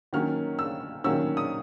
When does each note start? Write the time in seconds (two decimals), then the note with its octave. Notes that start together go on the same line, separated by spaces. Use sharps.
0.13 D#3 F#3 A#3 C#4 F6
0.59 E6
1.04 D#3 F#3 A#3 C#4 E6
1.37 D#6